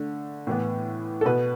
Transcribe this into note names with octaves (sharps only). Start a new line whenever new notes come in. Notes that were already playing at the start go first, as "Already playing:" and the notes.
Already playing: D3 A3
A2 E3 B3
A4
B2 B3 B4